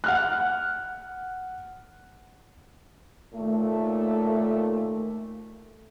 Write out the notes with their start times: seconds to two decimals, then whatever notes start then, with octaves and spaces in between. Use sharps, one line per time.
0.04 F#5 F6 F#6
3.34 D#2 A#2 A3